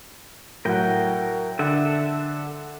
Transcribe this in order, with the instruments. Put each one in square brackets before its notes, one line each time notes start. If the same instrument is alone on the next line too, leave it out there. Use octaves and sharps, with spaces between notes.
[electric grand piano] A2 F#3 F#5 [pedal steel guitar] A#4 G5
[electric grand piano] D3 [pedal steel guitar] A4 E5 F#5